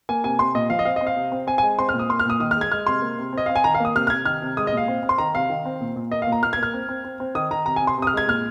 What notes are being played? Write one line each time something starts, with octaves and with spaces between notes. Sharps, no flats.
A#3 G#5
C3 G#5
C3 C6
A#2 D#5
F3 F5
D#5
C4 F5
D#5
C4
F5
C3
C4
C4 G#5
G#5
G#3
C4 C6
F6
A#2
D#6
A#3 C6
F6
A#2 D#6
D#3 D#6
F6
G#3 G#6
G#3 F6
C3 C6
A#3
C3
C4 D#5
C4 F5
G#5
D#3 A#5
F5
A#3 D#6
C3 F6
F6
C3 G#6
D#3 F6
C3
G#3 D#6
D#5
A#2 F5
C4
C4
C6
D#3 A#5
C3 F5
D#3
C4
A#2
A#2
A#3 D#5
F5
A#2
A#5
A#2 F6
G#6
A#3 F6
C4
C4
C4
C4
D#3 D#6
D#3 A#5
C3 A#5
G#5
C3
C6
C3 D#6
F6
G#3 G#6
A#2 F6